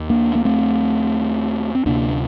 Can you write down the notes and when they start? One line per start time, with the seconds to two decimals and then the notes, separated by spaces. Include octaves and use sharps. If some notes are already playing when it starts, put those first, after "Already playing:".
Already playing: D#2
0.10 A#3 D4
0.35 A#3
0.45 A3 C4
1.75 C4
1.86 D2 C3 A#3 D4